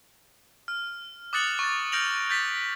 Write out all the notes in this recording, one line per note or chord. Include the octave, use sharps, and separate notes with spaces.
F6
D6 D#6 F#6 A6 C#7 F#7
C#6 A6
F6 G6 A#6 D7 F7 F#7
G6 A6 B6